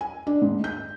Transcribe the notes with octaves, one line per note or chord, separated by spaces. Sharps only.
G#5
D4
G#2
G6